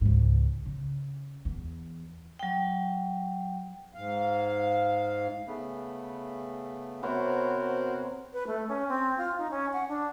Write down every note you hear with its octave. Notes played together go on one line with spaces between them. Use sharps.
C#2 G#2
C#3
E2
F#3 G5
G#2 F5
C#3 A3 B3
C3 B3 F#4 A#4 C5 C#5
B4
A3
C#4
C4
F4
D#4
C#4
F#5
D4